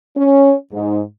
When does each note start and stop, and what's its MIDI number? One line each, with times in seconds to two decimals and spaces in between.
0.16 0.53 61
0.72 1.00 44